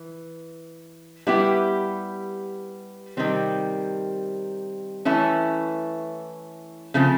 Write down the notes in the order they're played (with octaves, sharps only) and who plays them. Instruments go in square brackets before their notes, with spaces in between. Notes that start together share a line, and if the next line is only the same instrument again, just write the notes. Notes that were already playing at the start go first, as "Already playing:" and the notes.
Already playing: [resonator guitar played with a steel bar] E3
G3 B3 E4 G4
C3 D#3 G3 C4
E3 A3 C#4 E4
C#3 F3 A3 C4